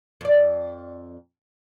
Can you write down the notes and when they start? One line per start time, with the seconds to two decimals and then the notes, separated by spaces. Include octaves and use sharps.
0.21 F2 D5